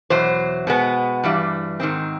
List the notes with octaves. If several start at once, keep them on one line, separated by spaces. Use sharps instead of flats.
E2 B2 F#3 C5
B2 G#3 B3
G2 E3 G3
G#2 D#3 G#3 C4